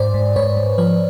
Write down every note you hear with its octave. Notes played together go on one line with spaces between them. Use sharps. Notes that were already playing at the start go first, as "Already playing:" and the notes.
Already playing: G#2 C5 D5
G#2
G#2 B4 C#5
G#2
F3 B4 C#5